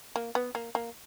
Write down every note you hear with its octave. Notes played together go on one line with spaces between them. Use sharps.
A#3
B3
A#3
A#3